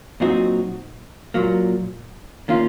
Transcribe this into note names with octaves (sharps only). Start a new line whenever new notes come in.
A#2 F#3 C4 D#4 F#4
A#2 F#3 A#3
D#3 A#3 C#4 F4